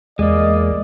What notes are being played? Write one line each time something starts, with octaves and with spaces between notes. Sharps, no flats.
E2 G#3 A#3 D5 D#5